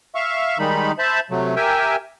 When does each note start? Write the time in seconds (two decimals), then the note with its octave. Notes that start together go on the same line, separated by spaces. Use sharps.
0.15 E5 F5 C#6
0.59 D#3 G3 G#3 D#4 B5
0.99 C5 E5 A5 B5
1.31 C3 F#3 A3
1.56 G4 A#4 E5 G5 G#5